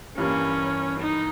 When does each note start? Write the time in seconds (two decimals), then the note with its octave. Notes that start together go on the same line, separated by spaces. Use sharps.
0.18 G2 E3 G3 A#3 C#4
1.00 D#4